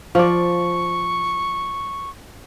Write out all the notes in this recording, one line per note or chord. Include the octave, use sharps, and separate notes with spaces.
F3 D5 C#6